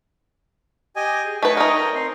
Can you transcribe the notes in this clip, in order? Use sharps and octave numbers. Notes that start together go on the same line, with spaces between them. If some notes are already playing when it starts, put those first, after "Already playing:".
G4 D#5 G#5
G#4
A3 B4 C#5 D#5 G5
D#4 A#4
C4 C6